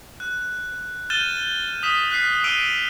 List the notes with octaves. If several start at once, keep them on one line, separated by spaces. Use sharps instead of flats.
F#6
F6 G6 A6 D#7 E7 G7
D#6 B6 E7
F6 F#6 B6 C7
D#6 E6 D7 D#7 F7 G7